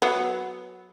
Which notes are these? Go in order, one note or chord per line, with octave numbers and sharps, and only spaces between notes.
F#3 B3